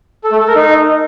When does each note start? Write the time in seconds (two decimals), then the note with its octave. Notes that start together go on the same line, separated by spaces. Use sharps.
0.24 A4
0.32 A3
0.40 A4
0.48 A#4
0.55 D#4